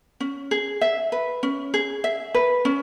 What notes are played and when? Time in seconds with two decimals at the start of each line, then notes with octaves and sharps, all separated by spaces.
0.20 C#4
0.51 G#4
0.81 E5
1.12 B4
1.43 C#4
1.74 G#4
2.04 E5
2.34 B4
2.65 C#4